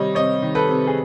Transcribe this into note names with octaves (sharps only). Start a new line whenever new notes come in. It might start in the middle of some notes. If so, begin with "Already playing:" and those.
Already playing: C3 D#3 G3 C#5 D#5
C3 C#5 D#5
D#3
A4 B4
C3
G#4